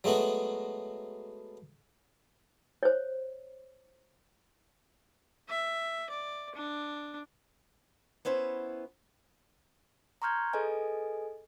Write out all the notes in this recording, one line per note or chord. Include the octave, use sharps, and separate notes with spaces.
F#3 G#3 A3 B3 F#4
C5 C#5
E5
D5
D4
B3 C#4 E4 C5
A#5 C6 C#6 F6 G6 G#6
G#4 A4 B4 D#5 G#5